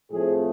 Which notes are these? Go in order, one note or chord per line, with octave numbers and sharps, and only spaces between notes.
A2 F3 A3 C4 G#4